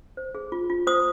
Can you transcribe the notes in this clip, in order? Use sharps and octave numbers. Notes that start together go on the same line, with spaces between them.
C5
G#4
F4
F4
C5 D#6